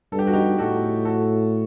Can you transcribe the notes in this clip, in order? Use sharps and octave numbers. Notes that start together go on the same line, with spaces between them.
G2 A4
G4
F#4
D#4 G4
A2 F#4 A4
F#4 A4